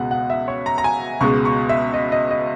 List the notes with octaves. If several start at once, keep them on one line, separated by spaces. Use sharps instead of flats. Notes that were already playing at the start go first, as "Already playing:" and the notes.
Already playing: C#2 B2 G#3 F#5
F#5
E5
C#5
A#5
A#5
G#5
C#2 B2 G#3 C#6
C#6
E5
D#5
D#5
D#5